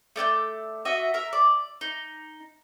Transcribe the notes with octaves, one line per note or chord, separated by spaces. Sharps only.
A3 D5 E6 G6
F#4 D#5 E5
A#4 E5
D5
D#4